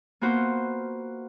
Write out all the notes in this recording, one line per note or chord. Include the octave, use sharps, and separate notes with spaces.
A#3 B3 F4 F#4 C5